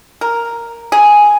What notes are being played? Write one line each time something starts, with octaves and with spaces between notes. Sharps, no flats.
A#4
G#4